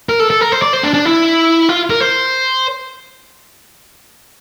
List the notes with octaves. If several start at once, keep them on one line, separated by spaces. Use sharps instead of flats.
A#4
A4
A4
A#4
C5
D5
C5
D4
D4
E4
F4
A#4
C5